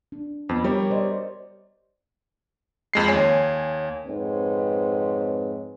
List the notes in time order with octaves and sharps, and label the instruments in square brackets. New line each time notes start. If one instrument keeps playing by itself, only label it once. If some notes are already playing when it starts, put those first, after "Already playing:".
[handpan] D4
[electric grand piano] F2 [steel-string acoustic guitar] B3
[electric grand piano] G3 [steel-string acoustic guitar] G4 A#4 C#5
[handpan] C5 D5 D#5
[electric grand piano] F2 G#3 C7
[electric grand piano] D#2 G#5 [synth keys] C#5
[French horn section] F2 G#2 C4 B4 C#5